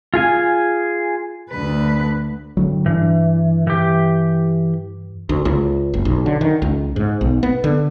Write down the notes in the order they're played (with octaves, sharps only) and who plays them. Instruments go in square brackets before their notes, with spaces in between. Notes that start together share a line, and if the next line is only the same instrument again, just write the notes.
[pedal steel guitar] F4 G#4 G#5
[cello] D2 B4
[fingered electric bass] G2 D3 F#3
[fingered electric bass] G2 D4 [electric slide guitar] E3
[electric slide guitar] E3 G4
[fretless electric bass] D2
C#2
F#1
B1
D3
D#3
C#2
G#2
B1
B3
D3